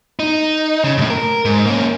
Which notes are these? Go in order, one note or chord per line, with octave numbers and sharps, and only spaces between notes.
D#4
C#3
F#2 A2
A#4
G#2
A#3 C#4